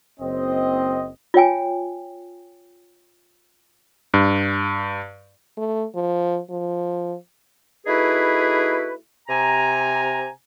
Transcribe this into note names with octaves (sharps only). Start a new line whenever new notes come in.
F#1 C4 D#5
F4 C#5 G5 G#5
G2
A3
F3
F3
A3 D#4 E4 F#4 G#4 B4
C3 G#5 A#5